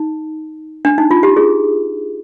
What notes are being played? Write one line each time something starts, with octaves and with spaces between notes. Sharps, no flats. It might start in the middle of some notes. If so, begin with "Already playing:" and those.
Already playing: D#4
D4
D#4
F4
G4
G#4